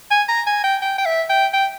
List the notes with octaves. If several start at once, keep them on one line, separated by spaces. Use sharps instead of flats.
G#5
A#5
G#5
G5
G5
G5
E5
G5
G5